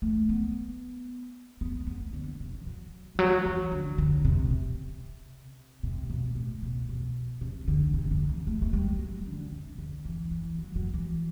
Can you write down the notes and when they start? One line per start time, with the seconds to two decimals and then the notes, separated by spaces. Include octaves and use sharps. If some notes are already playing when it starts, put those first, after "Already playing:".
0.02 A3
0.29 B3
1.61 B3
1.87 B3
2.13 D3
2.40 C3
2.53 E3
2.66 F#3
3.15 E3
3.19 F#3
3.46 E3
3.72 D3
3.98 D3
4.25 C3
4.51 C3
5.83 C3
6.10 B2
6.35 A2
6.62 B2
6.89 B2
7.41 C3
7.68 D3
7.94 C3
8.11 D3
8.29 E3
8.47 A3
8.62 A3
8.73 G3
8.99 F#3
9.26 D3
9.52 C3
9.78 D3
10.05 E3
10.31 E3
10.58 F#3
10.76 F#3
10.94 E3